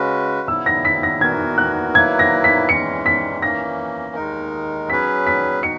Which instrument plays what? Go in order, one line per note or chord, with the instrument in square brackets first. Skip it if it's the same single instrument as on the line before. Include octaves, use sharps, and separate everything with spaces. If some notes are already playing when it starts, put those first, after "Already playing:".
Already playing: [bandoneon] C#3 G#3 C#4 F#4 B4
[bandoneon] C#3 F#3 B3 E4 [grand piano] E6
[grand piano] A#6
B6
A#6
[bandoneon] E3 B3 F#4 A#4 [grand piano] G#6
[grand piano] F#6
[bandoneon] F#3 A#3 E4 B4 [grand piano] G#6
[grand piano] A#6
B6
[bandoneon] E3 G#3 C#4 [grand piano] C#7
[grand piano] B6
[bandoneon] E3 A#3 C#4 [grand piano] A#6
[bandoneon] D#2 D#3 G#3 D#4 A#4
[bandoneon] F#3 C#4 G#4 B4 [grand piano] B6
[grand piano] B6
[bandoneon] D#4 F#4 [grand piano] C#7